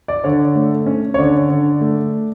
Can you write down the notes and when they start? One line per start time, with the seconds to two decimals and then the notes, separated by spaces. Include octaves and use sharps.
0.08 D5
0.24 D3 C#5
0.55 A3
0.86 C#4
1.14 C#5
1.18 D3 D5
1.50 D3
1.81 A3